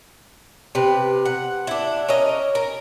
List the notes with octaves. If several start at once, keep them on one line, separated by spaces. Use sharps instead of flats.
C3 B4
F#5
D4 E4
C#4 A#4 D#5
A#4